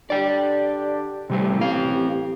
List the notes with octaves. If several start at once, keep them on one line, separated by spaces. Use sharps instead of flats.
D3 D4 G4 D5 G5
A1 C3 G3 A3 G4
C4 F5